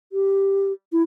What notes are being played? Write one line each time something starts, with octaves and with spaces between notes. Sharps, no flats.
G4
E4